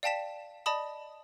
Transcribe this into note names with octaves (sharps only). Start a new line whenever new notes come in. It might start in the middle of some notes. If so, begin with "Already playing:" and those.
D5 F5 G5 A5 B6 E7
D5 D#5 A5 B5 D#6